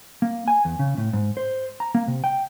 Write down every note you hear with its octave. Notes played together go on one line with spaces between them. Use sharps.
A#3
G#5
E2
C#3
A2
G#2
C5
A#5
A#3
C3
G5